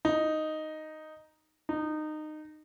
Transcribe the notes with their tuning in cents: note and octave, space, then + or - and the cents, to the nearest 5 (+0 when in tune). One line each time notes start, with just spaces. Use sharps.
D#4 +0
D#4 -20